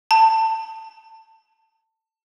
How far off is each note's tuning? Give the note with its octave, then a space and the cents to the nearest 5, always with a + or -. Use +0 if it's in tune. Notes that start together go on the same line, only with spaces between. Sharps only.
A5 +20